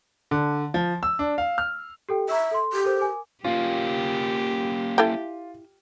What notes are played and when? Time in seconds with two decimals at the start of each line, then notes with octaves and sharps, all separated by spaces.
0.31 D3
0.74 F3
1.03 E6
1.19 D4
1.38 F5
1.58 F6
2.09 G4 A4 G5
2.29 E5 A#5 C#6 E6
2.51 A4 C6
2.73 G4
2.84 A4 A#4 C5
2.99 A#4 G#5 D6
3.44 A#3 C#4 F4 G4
4.98 E4 A4 G5